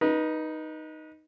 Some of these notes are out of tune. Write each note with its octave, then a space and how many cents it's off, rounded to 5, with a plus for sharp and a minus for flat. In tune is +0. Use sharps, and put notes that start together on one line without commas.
D#4 +0 B4 -30